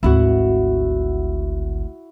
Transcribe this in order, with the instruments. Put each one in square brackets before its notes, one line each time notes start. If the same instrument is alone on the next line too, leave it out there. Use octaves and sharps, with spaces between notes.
[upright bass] G#1 D2 [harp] E4 F#4